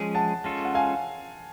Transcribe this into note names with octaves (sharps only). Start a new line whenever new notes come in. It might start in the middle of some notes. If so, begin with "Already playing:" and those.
Already playing: F3 G#3 C#4 G#4
F#5 A5
G#3 C#4 F4 A4
F#5
F5 G#5